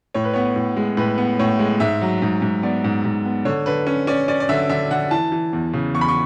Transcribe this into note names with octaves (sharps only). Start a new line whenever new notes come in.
A2 C#5
B4
B3 C#5
A2
G#3
A2 B4
B3
A2 C#5
G#3
G#2 E5
F#3
G#2
G#2
B3 D5
G#2
G#2
B3
D3 C#5
D3 B4
C#4
C#4 D5
C#4 D5
D5
D3 E5
D3 E5
D3 F#5
E3 A5
E3
E2
C#3
E2 C#6
B5
C#6